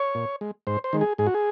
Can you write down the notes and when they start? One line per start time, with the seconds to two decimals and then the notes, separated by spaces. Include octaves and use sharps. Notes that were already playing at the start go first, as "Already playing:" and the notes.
Already playing: C#5
0.15 A#2
0.41 G#3
0.67 G#2 C5
0.84 C5
0.93 D#3 G#3
1.01 G#4
1.18 G#2 G#4
1.26 F#4
1.34 G#4